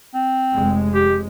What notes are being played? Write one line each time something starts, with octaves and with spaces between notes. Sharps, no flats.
C4
F1 G#3
G4